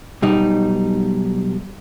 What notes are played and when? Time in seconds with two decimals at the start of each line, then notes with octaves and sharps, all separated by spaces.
0.22 B1 G3 D#4